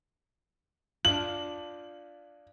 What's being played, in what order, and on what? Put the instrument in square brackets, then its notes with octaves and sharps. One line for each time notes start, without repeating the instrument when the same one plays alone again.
[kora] D4 F4 [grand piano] F#7